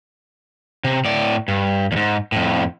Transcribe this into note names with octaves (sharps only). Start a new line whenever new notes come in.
C3
A2 D5
G2
E2 G#2
F2 A2